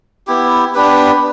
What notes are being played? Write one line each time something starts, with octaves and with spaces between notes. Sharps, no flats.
B3 E4 G4
B3 D4 G4 B4